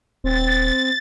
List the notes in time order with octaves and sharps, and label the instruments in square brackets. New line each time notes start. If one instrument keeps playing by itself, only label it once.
[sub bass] D#1 [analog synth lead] C4 [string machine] A6